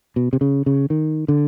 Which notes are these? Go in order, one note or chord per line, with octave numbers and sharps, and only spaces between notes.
B2
C3
C#3
C#3
D#3
D3